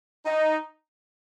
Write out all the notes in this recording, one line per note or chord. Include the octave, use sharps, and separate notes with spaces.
D#4